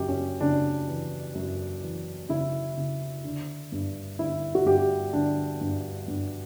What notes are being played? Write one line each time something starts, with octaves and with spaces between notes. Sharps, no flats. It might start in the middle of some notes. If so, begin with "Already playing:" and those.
Already playing: F#2 C#3 G4
C#4
C#3 D4
E3
F#2
E3
C#3 E4
C#3
D3
G2
D3 E4
F#4
G2 G4
D3 D4
G2
G2